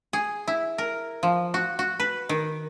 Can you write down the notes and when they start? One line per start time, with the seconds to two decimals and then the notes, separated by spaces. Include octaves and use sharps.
0.13 G#4
0.48 E4
0.78 A#4
1.23 F3
1.54 F#4
1.79 F#4
2.00 B4
2.29 D#3